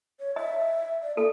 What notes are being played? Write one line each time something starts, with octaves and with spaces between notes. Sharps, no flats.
C#5
D#5 E5
D5
A#3 A4